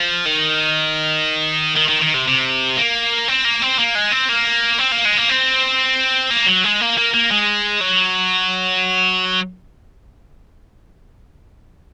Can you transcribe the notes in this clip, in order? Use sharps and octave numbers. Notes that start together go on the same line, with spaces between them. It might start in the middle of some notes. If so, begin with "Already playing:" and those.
Already playing: F3
D#3
D#3
D#3
D#3
C3
C3
A#3
C4
A#3
C4
A#3
G#3
C4
A#3
C4
A#3
G#3
A#3
C4
A#3
F#3
G#3
A#3
A#3
A#3
G#3
F#3